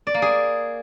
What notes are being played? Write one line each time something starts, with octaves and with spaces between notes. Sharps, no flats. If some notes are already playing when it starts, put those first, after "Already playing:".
D5
A#3
G#4